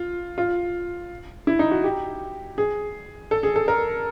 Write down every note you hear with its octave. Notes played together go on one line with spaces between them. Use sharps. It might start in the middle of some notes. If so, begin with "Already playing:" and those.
Already playing: F4
F4
E4
D#4
F#4
G4
G#4
A4
G#4
A4
A#4